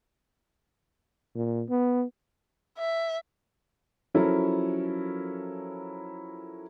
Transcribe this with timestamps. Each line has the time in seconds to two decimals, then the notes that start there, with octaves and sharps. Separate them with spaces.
1.35 A#2
1.69 B3
2.78 E5
4.14 F3 F#3 C#4 E4 A4 A#4